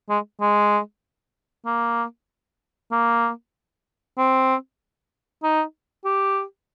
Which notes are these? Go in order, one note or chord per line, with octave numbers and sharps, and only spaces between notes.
G#3
G#3
A#3
A#3
C4
D#4
G4